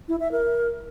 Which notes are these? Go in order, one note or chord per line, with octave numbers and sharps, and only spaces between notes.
E4
E5
A#4